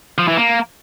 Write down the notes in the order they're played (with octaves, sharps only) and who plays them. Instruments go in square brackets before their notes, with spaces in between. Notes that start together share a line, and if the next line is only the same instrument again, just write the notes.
[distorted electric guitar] F3
E3
A#3